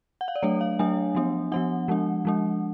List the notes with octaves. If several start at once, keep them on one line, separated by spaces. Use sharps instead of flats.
F#5
F5
D5
F#3 A3 D4 C#5
F5
F#3 A3 D4 G#5
F3 B3 D4
F3 B3 D4 F#5
F3 G#3 D4
F3 G#3 D4